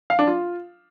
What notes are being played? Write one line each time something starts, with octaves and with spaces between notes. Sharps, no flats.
F5
D4
F4